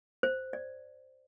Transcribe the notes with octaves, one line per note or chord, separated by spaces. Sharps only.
C5
D5